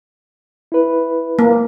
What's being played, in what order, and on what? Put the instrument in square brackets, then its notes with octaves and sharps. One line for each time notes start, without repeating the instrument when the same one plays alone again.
[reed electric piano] E4 B4
[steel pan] A#3